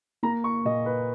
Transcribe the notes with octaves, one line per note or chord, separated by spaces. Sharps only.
A#3 A#5
C#6
A#2 D#5
B4